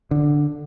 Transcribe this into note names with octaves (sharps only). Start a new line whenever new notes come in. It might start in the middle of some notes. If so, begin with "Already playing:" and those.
D3